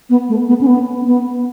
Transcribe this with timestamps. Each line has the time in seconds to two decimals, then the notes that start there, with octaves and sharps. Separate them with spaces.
0.10 B3
0.29 A3
0.48 B3
0.61 C#4
0.67 B3
1.06 B3